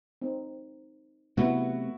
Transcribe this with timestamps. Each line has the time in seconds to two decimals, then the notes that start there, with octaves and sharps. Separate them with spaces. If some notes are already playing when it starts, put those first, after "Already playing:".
0.22 C4 D#4
1.37 C3 F#3 A3 B3 E4 F#4